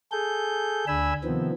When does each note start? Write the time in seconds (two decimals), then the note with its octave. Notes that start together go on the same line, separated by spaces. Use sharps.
0.12 G#4 A4 G6
0.88 D2 D4 G#5 B5 E6
1.24 C3 D#3 F3 B3 C4